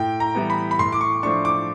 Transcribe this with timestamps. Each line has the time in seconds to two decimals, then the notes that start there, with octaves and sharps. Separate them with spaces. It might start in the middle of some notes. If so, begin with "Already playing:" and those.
Already playing: A2 G5
0.20 A#5
0.35 E3 G3 B3
0.50 B5
0.71 B5
0.79 A2 C6
0.92 D6
1.01 C#6
1.23 F3 A3 D4 C#6
1.45 D6